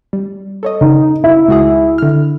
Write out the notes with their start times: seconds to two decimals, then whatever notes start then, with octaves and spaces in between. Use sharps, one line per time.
0.13 G3
0.63 A4 C#5 D#5
0.81 C#3 D#4
1.24 E4
1.48 C#2 F#4 G#4
1.98 D3 F6